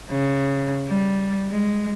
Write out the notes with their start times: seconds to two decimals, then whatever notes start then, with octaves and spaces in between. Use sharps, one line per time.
0.11 C#3
0.87 G3
1.50 G#3